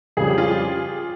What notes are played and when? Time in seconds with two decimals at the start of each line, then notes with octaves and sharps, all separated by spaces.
0.17 F2 C#3 G3 G#4
0.27 G4
0.38 F4
0.47 G4